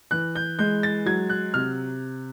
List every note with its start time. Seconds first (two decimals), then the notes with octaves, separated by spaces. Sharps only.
0.11 E3 F#6
0.35 G6
0.59 G#3 G6
0.83 A6
1.06 F#3 G#6
1.30 F#6
1.54 C3 F6